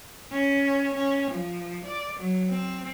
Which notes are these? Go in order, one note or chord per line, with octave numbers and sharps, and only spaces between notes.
C#4
C#4
F3
D5
F#3
C4